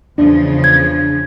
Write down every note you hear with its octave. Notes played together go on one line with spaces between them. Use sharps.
E2 C#3 F3 D4
G#6